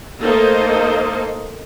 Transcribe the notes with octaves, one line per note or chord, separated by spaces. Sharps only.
A3 A#3 D#4 A4 C5 D#5